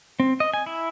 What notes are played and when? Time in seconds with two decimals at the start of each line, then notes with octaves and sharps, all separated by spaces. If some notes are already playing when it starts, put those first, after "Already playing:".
0.20 C4
0.40 D#5
0.54 G#5
0.66 E4